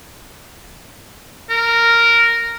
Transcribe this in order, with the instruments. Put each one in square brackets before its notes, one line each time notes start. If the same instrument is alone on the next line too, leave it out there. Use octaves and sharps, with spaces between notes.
[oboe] A#4